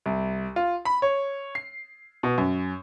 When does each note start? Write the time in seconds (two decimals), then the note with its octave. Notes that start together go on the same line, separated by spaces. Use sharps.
0.06 C2
0.56 F4
0.85 B5
1.02 C#5
1.55 C7
2.23 B2
2.38 F#2